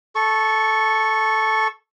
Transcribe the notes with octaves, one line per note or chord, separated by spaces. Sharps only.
A4 C#6